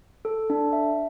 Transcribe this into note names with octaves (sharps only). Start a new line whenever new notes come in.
A4
D4
E5